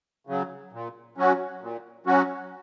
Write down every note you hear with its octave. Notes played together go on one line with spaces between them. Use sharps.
C#3 F#3
A#2
F#3 C#4 F#4
A#2
F#3 C#4 F#4